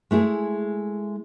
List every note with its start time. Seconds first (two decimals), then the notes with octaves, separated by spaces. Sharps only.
0.11 G#3 A3 E4 G#4